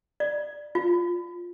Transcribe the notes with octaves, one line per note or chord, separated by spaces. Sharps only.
D5
F4